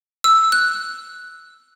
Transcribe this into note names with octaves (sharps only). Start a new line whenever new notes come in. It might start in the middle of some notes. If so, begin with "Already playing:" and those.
E6
F#6